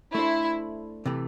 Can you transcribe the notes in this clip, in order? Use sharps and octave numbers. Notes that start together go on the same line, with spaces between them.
A3 D4 E4 A4 C5
C3 E3 A3